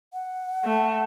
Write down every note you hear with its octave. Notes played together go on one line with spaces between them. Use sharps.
F#5
A3